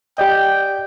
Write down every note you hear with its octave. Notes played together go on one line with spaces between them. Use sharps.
G4 D5 D#5 G5